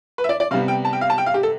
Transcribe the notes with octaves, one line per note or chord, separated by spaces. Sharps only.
B4
E5
D5
D5
C3 G3 B3 F5
G5
A5
G5
F5
A5
G5
F5
G4
A4